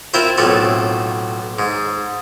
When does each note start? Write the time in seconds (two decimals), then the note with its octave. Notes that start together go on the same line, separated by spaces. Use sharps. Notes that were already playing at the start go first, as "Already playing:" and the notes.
0.14 C4 E4 F4 A#4 C5
0.38 B1 A2 C4 F4 A4
1.59 G#2